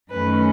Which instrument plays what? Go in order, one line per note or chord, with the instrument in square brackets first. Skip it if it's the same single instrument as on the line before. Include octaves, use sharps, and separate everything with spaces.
[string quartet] F#2 D#3 F#3 A3 C#4 B4